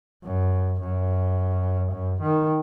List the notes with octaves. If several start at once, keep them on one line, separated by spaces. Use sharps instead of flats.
F#2
F#2
F#2
D#3